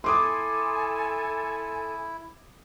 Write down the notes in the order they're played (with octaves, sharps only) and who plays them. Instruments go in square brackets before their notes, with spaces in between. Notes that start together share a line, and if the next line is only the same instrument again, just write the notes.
[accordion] E4 [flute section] A4 G#5 [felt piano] C6 D6 D#6